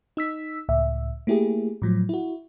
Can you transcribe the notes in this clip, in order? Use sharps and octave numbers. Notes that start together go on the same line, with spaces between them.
D#4 E6 B6
C#2 A2 E5
A3 A#3 E4 G4 G#4
A2 F3 F#3
E4 F#4